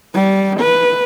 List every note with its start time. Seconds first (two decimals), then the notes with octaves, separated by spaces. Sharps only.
0.14 G3
0.60 B4